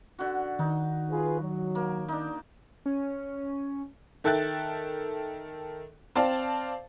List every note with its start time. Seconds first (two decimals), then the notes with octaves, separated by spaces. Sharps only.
0.19 D3 F#4
0.59 D#3 D#4
1.11 F4 G#4 B4
1.41 F#3
1.75 A#3
2.08 D4 D#4
2.86 C#4
4.24 D#3 A4 E5 G5 F#6 A6
6.15 C4 C5 D5 F5 A5